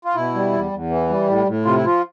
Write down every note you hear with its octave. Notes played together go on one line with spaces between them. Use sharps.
F4
B2 E4
G3
E2
E2
E3
G3
A2
A2
C3 F4
E4
F3 F4